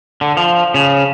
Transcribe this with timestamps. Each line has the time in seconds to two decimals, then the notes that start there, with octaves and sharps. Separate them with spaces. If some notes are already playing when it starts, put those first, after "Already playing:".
0.21 D3
0.37 F3
0.74 C#3